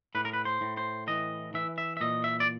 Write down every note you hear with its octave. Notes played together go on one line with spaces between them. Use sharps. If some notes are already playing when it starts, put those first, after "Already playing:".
A2 B4
A#4
B4
C5
A2
C5
E3 D#5
E3 E5
E5
E5
A#2 D#5
E5
D5